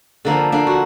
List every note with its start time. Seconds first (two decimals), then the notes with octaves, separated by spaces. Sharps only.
0.25 D3 F3 A#3 D4
0.52 A#3 D4
0.67 F#4